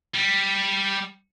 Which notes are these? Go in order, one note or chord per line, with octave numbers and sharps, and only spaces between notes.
G3